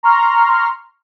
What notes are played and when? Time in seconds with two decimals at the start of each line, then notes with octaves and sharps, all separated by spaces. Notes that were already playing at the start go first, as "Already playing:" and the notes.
0.03 A#5 C6 C#6 F6